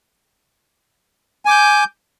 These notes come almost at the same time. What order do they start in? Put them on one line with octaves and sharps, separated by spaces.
G#5 D6 G6